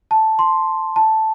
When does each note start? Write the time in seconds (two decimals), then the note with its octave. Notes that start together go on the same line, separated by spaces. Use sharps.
0.11 A5
0.39 C6
0.96 A5